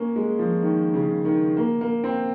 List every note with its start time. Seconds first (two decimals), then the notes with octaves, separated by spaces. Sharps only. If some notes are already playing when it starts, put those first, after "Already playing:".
Already playing: A#3 C#4
0.16 G#3
0.39 F3
0.63 D#3
0.94 C#3
1.25 D#3
1.57 A#3
1.81 A#3
2.04 C4